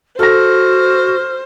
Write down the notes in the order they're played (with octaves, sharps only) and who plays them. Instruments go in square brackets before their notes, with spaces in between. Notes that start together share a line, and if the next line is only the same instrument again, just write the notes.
[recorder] F#4 [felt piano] A4 A#6 [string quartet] C5 [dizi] F6